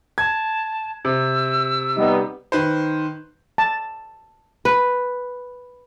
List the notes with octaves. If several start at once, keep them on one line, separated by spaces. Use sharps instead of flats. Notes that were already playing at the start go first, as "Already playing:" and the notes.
A5 G#6
C3 E6
G3 B3 D#4
D#3 B4 C5
A5
B4